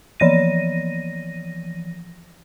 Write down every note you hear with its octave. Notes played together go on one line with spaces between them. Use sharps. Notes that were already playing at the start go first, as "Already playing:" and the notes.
E3 F3 A#6 D#7